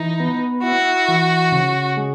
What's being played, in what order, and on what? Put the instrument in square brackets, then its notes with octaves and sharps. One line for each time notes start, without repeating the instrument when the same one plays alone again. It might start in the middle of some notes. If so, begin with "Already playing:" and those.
Already playing: [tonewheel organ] E3 [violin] D#4
[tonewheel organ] B3
[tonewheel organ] E4 [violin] F#4
[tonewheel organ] E3
C#3
G#3